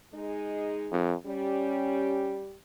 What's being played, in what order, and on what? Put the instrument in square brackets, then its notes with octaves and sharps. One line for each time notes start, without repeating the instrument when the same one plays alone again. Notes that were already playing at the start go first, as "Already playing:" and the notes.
[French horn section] G#3 D#4 G#4
[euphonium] F2
[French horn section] G3 G4 [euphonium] C#4